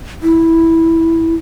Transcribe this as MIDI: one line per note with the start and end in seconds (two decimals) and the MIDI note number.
0.23 1.35 64